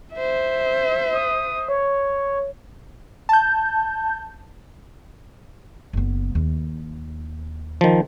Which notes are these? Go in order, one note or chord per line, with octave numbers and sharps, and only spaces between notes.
C5 E5
D#6
C#5
A5 G6
F#1 B3
D#2
D#3 F3